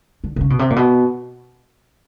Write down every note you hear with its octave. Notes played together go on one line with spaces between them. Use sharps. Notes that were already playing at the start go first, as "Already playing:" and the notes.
D3
C3
C#3
B2
C3
A#2
B2